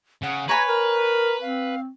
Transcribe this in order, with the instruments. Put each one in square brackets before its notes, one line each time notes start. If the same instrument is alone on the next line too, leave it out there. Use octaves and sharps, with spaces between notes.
[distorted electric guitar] C#3 [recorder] F#5
[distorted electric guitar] B4 [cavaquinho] C#5 G#5 B5 [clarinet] A#5 [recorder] G#6
[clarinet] A#4 [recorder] A#5
[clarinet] C4 [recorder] F5